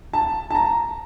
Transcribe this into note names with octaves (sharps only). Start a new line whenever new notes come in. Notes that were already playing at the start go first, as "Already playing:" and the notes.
A5
A5
A#5